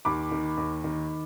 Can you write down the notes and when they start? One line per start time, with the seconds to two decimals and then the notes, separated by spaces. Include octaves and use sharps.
0.05 D#2 B5 D6
0.31 D#3
0.57 D#2
0.84 D#3